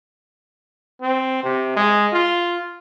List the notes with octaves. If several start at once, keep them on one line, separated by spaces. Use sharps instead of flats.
C4
C3
G#3
F4